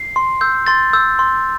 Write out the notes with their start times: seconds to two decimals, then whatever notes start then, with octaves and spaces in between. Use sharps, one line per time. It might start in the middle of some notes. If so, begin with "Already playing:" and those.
Already playing: C7
0.16 C6
0.41 E6 G6
0.67 C6 A6
0.93 E6 G6
1.19 C6